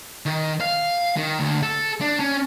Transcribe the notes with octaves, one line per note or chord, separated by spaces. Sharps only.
D#3
F5
D#3
D2
A4
D4
C#4